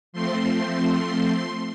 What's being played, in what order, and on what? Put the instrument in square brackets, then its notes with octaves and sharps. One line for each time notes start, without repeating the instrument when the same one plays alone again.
[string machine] F3 A3 C4 C6